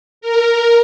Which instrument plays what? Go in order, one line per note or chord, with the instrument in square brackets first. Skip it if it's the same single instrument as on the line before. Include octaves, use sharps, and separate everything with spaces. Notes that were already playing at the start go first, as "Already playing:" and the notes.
[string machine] A#4